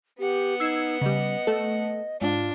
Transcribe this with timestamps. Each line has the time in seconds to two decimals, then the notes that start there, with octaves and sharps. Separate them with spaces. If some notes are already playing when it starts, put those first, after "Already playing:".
0.20 B3 G4 F#5
0.60 D#4 E6 G#6 C7
1.01 C#3 G3 D#5
1.47 A3 A4
2.22 G#2 D4 F4